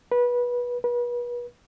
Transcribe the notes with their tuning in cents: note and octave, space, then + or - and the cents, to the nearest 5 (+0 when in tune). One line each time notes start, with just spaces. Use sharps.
B4 -20
B4 -35